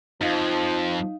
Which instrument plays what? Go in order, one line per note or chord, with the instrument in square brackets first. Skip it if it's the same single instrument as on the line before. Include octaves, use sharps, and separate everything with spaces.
[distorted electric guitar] F2 [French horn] F3 [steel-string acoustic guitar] D#4 F5